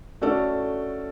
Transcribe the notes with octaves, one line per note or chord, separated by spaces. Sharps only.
A3 C#4 F#4 A4 D5